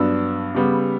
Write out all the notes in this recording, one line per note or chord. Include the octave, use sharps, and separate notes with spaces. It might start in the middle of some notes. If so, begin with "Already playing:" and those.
Already playing: G2 F#3 B3 D4 E6
C#3 G3 B3